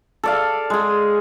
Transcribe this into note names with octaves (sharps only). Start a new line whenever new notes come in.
A4 D5 F5
G#3 G#4